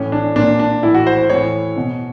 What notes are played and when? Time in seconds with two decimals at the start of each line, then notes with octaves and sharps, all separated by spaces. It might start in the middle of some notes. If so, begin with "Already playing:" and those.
Already playing: A2 E3 C#4
0.12 D4
0.36 A#2 D4
0.59 D4
0.83 A2 E3 E4
0.94 F#4
1.07 C5
1.30 A2 E3 C#5
1.77 B2